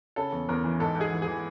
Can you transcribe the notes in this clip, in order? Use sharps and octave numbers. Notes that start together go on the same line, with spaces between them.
C#3 A4
E2
E2 A#4
E3
G#2 A4
G#2
G#4
E3
E3 G#4